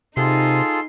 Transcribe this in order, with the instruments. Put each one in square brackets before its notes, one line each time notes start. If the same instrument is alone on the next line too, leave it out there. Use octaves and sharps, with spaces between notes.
[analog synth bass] C3 [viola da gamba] D#4 [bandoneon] F4 G#4 A4 [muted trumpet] C6